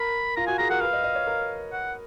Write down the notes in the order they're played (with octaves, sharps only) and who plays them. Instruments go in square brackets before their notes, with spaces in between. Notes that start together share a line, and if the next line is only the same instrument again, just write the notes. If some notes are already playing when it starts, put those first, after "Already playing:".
Already playing: [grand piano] A#4 [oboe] B5
[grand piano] F4 [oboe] A#5
[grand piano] F#4 [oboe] G#5
[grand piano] G#4 [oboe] A#5
[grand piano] A#4 [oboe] F#5
[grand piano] B4 [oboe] F5
[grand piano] D#5
D#5
C#5
A#4
[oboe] F#5